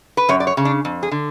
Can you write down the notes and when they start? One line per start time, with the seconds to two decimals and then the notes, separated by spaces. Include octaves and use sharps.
0.17 B4
0.29 F#2 C#5
0.40 D5
0.47 C#5
0.57 C#3
0.65 D4
0.85 F2
1.03 G#4
1.12 D3